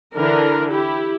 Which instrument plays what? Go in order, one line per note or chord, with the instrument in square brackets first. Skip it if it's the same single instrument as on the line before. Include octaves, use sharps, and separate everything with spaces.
[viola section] D3 E3 D4 A#4
E4 G4